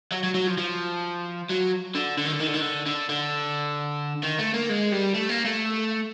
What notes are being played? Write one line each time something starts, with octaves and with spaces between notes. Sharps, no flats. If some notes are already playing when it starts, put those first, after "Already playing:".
F#3
F#3
F#3
F3
F3
F#3
D3
D3
D#3
D3
D#3
D3
D#3
D3
D3
D3
D#3
A3
A#3
G#3
G3
A3
A#3
A3